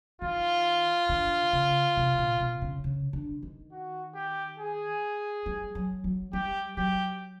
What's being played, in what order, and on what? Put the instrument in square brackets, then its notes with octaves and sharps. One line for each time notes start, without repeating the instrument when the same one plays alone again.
[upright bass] D#3 [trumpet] F4
[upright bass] D3
C#3
C3
A#2
B2
C#3
C#3
D3
D#3
[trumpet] F#4
G4
G#4
[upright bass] G3
F#3
F#3
[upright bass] G3 [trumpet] G4
[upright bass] F#3 [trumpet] G4